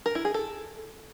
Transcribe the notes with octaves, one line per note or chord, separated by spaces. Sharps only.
A#4
E4
G#4
A4